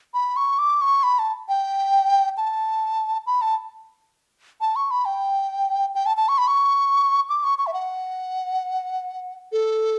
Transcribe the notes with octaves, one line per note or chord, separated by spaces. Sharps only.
B5
C#6
D6
C#6
B5
A5
G5
A5
B5
A5
A5
C#6
B5
G5
G5
A5
A5
C#6
B5
C#6
D6
C#6
C#6
E5
F#5
A4